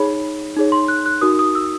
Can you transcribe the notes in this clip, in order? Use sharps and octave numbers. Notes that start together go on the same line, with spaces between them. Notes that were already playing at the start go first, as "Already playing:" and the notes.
Already playing: D#4 G#4 C#5 B5
D#4 G#4 C#5
C6
F#6
F#6
D#4 F#4 A#4 D#6
D#6
E6